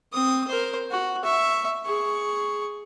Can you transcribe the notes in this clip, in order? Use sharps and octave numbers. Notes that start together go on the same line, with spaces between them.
C4 D#6
A#4 C5
F#4
E5 C#6
G#4 C#6